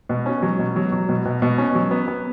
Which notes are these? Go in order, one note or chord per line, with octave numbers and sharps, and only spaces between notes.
B2
C#4
F#3
B2
F#3
F#3
B2
B2
B2
C#4
F#3
B3
B3